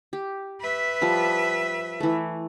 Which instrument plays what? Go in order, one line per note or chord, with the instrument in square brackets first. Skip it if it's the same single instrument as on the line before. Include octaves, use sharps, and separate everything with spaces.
[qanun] G4
[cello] B4 E5
[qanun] F3 G3
E3 A3